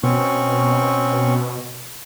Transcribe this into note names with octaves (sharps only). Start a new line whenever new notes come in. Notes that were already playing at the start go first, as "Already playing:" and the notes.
B2 C4 C#4 C#6